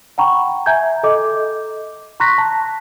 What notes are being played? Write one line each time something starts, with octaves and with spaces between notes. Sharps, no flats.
F#5 G5 A#5 B5 C#6
E5 G#5 A#5 G6 G#6
A4 D#5 D6
A#5 C6 C#6 F#6 A#6 B6
A5